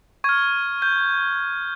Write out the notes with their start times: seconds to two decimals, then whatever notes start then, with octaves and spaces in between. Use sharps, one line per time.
0.24 C#6 F6 G#6
0.82 G6